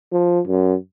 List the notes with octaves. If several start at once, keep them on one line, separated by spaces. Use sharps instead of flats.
F3
F#2